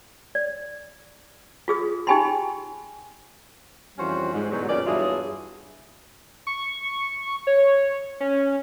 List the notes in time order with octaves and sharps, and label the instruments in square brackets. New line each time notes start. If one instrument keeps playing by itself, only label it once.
[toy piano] D5
F4 G#4 D#6
D#4 G4 G5 G#5 B5 C6
[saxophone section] F2 E3 G3 C#4 F#4 C5
G#2
E2 G#2 B2 D3 F#3
F#2 A#2 D#3 C#4 D5
E2 G2 F#3 E4 F4 G#4
[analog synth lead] C#6
C#5
C#4